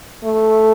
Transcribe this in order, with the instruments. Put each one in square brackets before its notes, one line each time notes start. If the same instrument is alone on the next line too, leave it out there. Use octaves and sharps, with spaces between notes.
[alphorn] A3